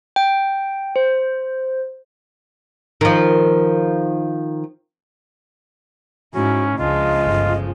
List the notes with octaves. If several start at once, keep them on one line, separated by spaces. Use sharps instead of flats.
G5
C5
D#3 F3
G#2 C#4 E4 F#4
C#2 C#3 F3 G#3 D4 F4 D#5
G1